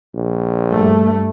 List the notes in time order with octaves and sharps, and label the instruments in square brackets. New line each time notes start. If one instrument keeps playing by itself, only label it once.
[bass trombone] A#1
[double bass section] G2 A3